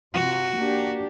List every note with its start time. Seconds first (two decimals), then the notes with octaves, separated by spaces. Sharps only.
0.14 C3 F4 F#4
0.55 A#3 D4 G4